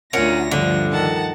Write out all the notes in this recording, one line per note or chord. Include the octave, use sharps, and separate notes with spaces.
D2 C#4 F4 A#4 C#5 F#5 A#6
G2 D3 F3
D#3 F#5 A5